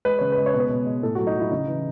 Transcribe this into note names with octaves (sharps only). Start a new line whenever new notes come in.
G#3 B4
C#3 C#5
B4
G#3
C#5
B2
B4
B2
G#3
A2 A4
F#3 F#4
D#4
F#3 E4
C#3 D#4
E3